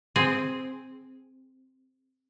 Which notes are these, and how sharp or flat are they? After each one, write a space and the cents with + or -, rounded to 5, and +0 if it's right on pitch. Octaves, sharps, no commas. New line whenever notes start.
C4 +0 G#4 +0